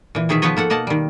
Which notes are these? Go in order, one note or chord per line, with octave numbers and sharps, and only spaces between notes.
A#2 E3
B2 D#3 G#4 C#5 E5
F3 B3 D#4 B4 C#5 D#5
A#3 A4 F#5
B2 A#3 D#5 F#5 A5
D#3 G3